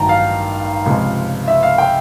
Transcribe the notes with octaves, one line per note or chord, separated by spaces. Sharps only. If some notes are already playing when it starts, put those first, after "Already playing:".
Already playing: A1 G2 D#3 F#3 G5 A5 A#5
F5
C#2 C3 F3 G#3
E5
F5
G5